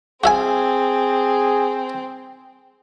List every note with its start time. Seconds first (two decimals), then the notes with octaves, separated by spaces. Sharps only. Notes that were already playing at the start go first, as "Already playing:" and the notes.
0.24 C4 F#4 G#4 E5 G#5